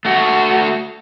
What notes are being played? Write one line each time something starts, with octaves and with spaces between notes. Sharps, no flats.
A3 F#4